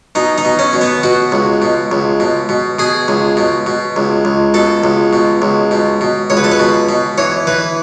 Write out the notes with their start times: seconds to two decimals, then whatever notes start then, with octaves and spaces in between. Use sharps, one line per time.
0.15 B2 D#4
0.38 D#4
0.45 B2
0.59 C#4
0.73 B2
0.81 B3
1.03 B2 F#4
1.32 C#2
1.62 B2
1.91 C#2
2.20 B2
2.49 B2
2.79 B2 G#4
3.08 C#2
3.37 B2
3.66 B2
3.96 C#2
4.25 C#2
4.54 B2 A4
4.84 C#2
5.13 B2
5.42 C#2
5.71 B2
6.01 B2
6.30 C#2 C#5
6.37 B4
6.44 A4
6.52 B4
6.59 B2
6.89 B2
7.18 E3 C#5
7.47 E3 B4